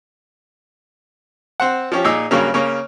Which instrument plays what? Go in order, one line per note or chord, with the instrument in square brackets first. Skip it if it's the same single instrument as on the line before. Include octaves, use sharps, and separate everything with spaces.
[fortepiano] C4 C5 F#5
F3 C#4 G4
A#2 D#4 G#4 D6 E6
G2 C#3 F#3 A#3 C#4
C#3 A#3 C#4